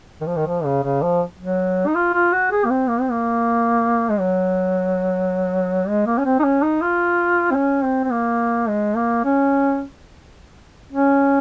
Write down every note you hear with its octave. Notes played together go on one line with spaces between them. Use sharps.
D#3
F3
D#3
F3
C#3
C#3
F3
F#3
D#4
F4
F4
F#4
G#4
A#3
C4
A#3
C4
A#3
G#3
F#3
G#3
A#3
C#4
C4
D#4
C#4
D#4
F4
C4
C#4
C4
C4
A#3
G#3
A#3
C#4
C#4